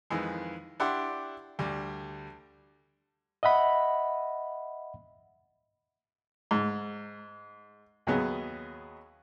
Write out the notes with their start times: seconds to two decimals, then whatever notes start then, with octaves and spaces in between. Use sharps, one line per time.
0.10 F2 D#3 E3 G#3
0.80 D4 E4 G4 F#5 G5 C6
1.59 D2 G3
3.43 D#5 E5 F#5 B5
6.51 G#2
8.07 D#2 F#3 B3 G#4